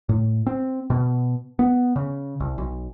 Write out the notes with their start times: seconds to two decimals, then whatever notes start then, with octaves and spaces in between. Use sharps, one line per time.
0.09 A2
0.46 C4
0.90 B2
1.59 B3
1.96 C#3
2.40 C2
2.58 B1